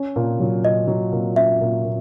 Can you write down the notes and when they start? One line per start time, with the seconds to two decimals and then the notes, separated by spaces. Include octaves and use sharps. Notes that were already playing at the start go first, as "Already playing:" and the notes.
Already playing: C#4
0.16 A#2
0.40 F#3
0.64 A#2 D#5
0.88 F#3
1.13 A#2
1.36 C#4 E5
1.61 A#2
1.85 A#2